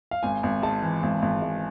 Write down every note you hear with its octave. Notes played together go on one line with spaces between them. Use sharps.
F5
G#1 G#5
G#1
G#2 A5
E3
G#1
G#1
G#2